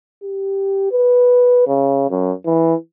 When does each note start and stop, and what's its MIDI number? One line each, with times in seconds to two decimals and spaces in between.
0.23 0.88 67
0.92 1.65 71
1.67 2.10 49
2.11 2.32 42
2.46 2.75 52